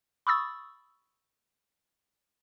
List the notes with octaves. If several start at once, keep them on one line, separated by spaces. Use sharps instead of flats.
B5 C#6 D#6 E6 A6